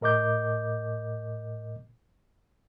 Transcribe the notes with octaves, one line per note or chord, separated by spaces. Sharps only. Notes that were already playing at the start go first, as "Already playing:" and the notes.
A2 A#4 D#5 D6 G6